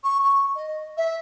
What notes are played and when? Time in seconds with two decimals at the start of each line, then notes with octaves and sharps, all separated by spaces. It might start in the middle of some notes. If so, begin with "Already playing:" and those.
0.04 C#6
0.24 C#6
0.55 D#5
0.97 E5